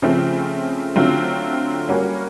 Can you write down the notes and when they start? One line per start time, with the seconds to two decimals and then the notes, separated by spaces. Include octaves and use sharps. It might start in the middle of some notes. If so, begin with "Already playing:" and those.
0.02 C#3 F3 A3 C4
0.96 D3 F#3 A3 C4 F4
1.89 G3 A#3 C#4 F#4